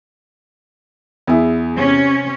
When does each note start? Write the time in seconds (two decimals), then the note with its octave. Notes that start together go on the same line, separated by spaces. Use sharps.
1.27 E2 E4 G#4
1.73 C3 C#4